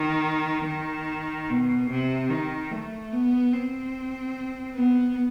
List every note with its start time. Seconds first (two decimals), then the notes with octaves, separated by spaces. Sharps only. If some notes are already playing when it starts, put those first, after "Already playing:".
Already playing: D#3
0.67 D#3
1.50 B2
1.90 C3
2.30 D#3
2.71 A3
3.13 B3
3.53 C4
4.75 B3